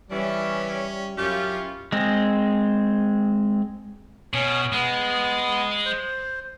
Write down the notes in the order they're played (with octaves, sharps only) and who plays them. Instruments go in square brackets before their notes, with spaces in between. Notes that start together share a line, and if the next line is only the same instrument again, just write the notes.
[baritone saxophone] E3 [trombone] G3 [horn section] C#4 [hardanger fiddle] D5 E5
[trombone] F#2 [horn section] C#4 E4 F4 [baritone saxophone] G4 [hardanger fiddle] C#6
[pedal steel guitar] G#3 C4
[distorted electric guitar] B2 [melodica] C#4 C#5
[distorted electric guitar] G#3 [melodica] B3
[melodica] C5